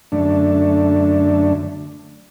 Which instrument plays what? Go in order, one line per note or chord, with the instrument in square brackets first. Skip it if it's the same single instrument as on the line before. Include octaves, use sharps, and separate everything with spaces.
[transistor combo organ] F#2 D3 A3 D4